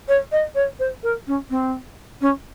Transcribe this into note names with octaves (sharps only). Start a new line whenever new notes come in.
C#5
D#5
C#5
C5
A#4
C#4
C4
C#4